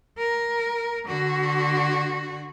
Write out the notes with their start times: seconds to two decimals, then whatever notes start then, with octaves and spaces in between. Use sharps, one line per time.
0.18 A#4
1.06 D3 F#4